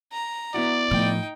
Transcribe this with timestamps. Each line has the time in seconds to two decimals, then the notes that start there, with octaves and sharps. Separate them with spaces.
0.12 A#5
0.54 B3 E4 F#4 D5
0.91 A2 F3 D#4 G5